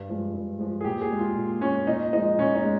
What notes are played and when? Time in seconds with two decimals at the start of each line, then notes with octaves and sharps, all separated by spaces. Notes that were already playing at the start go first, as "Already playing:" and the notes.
Already playing: G2
0.09 F3 G#3
0.34 G2
0.59 F3 G#3
0.81 G#4
0.84 A#2 G4
1.02 G#4
1.11 G#3
1.19 F4
1.35 A#2
1.61 G#3 C#4
1.87 A#2 D#4
2.13 F3 G#3 D#4
2.39 A#2 C#4
2.55 D#4
2.64 G#3